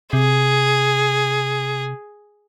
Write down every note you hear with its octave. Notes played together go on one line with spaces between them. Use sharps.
C3 G#4